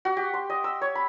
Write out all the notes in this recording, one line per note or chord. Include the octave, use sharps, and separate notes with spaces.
F#4
G4
C6
D#5
E6
C#5
B5